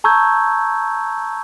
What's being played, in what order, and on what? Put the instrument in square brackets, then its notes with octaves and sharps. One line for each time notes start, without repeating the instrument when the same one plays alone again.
[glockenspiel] A5 A#5 C#6 E6 G6 G#6